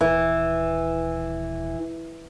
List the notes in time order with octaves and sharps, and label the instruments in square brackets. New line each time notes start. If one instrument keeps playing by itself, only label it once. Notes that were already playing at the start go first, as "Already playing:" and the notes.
[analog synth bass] D#1 [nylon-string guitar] E3